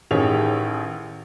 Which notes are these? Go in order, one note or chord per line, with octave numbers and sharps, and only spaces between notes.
A1 D#3 G4 G#4 C#5 F7